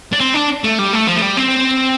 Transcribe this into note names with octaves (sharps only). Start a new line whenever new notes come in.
D4
C4
D4
A3
G3
A3
F3
A3
G3
C4